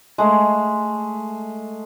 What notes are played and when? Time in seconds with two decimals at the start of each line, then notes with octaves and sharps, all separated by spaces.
0.18 G#3 A3